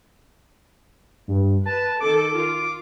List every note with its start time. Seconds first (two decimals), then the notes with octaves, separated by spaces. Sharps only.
1.28 G2
1.66 B4 A5
2.00 D#3 A4 D6
2.38 F4